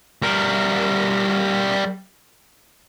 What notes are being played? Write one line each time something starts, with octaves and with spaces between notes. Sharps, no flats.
G3 A#4